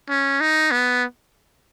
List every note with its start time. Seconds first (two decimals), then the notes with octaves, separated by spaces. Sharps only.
0.09 C#4
0.41 D#4
0.71 B3